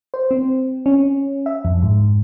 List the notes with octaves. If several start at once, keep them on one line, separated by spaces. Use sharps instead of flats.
C5
C4
C#4
E5
F2
G#2